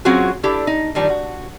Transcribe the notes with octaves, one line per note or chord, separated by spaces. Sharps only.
F#3 C4 C#4 F4 F#4 G#4
D4 E4 G4 A4
D#4
D#3 F3 G3 D4
F#4